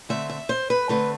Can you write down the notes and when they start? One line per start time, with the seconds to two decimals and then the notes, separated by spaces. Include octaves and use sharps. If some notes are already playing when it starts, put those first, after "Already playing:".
0.09 D3 A3 C4 E5
0.29 E5
0.49 C5
0.70 B4
0.89 D3 A3 C4 B4